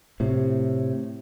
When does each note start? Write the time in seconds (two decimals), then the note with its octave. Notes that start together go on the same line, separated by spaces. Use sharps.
0.20 A2 C3